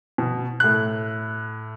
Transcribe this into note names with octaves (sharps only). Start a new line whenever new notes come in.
B2
A2 F#6